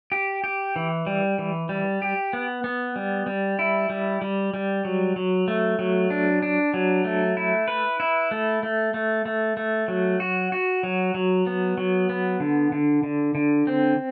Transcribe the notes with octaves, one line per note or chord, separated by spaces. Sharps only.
G4
G4
E3
G3
E3
G3
G4
B3
B3
G3
G3
E4
G3
G3
G3
F#3
F#3
A3
F#3
D4
D4
F#3
A3
E4
B4
E4
A3
A3
A3
A3
A3
F#3
F#4
F#4
F#3
F#3
B3
F#3
B3
D3
D3
D3
D3
C4